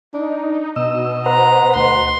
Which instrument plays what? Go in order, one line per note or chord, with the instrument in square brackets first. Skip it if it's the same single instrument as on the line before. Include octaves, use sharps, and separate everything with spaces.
[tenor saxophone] D4 [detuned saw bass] D#4
[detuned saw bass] B2 [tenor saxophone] D#5 [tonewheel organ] E6
[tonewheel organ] B4 C5 F#5 [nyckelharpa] A#5
[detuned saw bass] D2 [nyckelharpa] C6